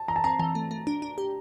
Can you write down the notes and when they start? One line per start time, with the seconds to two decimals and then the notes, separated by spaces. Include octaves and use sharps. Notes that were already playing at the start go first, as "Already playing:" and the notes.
Already playing: A5
0.08 E3 A#5
0.16 A5
0.24 C4 A#5
0.39 E3 A5
0.55 A3
0.71 A3
0.87 D4
1.02 D4
1.18 G4